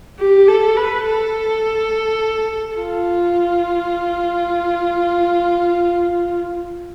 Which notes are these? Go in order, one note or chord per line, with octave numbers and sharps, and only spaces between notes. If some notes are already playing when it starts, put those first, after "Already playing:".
G4
A4
B4
A4
F4